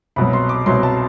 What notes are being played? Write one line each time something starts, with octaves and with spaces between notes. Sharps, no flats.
C2 B2 F#3 B5
C6
D6
C2 B2 F#3 C6
A5